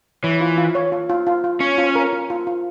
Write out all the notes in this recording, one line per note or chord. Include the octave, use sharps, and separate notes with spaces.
E3 C#5
F4
F4
C#5
F4
F4
F4
F4
C#4 C#5
F4
A#4
F4
F4
F4